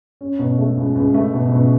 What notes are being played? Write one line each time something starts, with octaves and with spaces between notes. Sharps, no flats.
C#4
B2
A3
C#2
C#2
A3
B2
B2